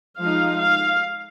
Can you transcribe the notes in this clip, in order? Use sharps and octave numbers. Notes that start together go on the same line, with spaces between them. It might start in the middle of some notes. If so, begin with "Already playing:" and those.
F3 G#3 D#4 F5
F5